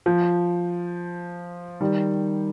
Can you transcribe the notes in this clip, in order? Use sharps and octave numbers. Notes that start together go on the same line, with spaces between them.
F3
D#3 G3